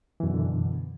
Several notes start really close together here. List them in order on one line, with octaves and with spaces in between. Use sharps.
E3 F#2 B2 D3